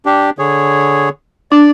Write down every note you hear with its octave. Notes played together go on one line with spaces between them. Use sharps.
D4 G4
D3 G#4 C#5
D4 D5